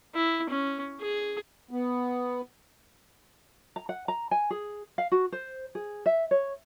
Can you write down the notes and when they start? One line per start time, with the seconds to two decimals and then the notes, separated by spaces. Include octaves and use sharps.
0.15 E4
0.50 C#4
1.01 G#4
1.71 B3
3.76 A#5
3.89 F#5
4.08 A#5
4.31 G#5
4.51 G#4
4.98 F5
5.12 F#4
5.32 C5
5.75 G#4
6.06 E5
6.31 C#5